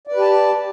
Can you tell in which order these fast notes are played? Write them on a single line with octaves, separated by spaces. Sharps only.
D5 B4 G4 A5